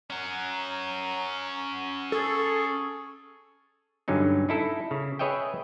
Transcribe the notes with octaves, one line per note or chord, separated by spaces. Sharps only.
C#4 F#5 A#5
G#4 A4 C#6
G2 D3 F#3 C#4 D#4
D#4 E4 A4
C#3
G#4 B4 C#5 D#5 E5 G5